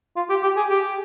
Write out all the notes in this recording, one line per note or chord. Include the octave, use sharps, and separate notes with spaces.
F4
G4
G4
G#4
G4